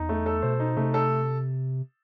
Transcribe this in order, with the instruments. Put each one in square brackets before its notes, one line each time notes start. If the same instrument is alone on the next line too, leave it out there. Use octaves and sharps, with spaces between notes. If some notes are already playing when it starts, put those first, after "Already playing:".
Already playing: [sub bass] E2 [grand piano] D#4
[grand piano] A3
A4
[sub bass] B2 [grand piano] C5
[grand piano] D#4
[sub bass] C3 [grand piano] A3
[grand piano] A4